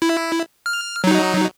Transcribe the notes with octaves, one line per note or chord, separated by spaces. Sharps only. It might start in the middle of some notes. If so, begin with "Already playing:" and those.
E4
F6
F#3 D#4